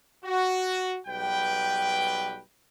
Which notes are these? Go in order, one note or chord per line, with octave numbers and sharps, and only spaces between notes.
F#4
B1 G3 B4 G5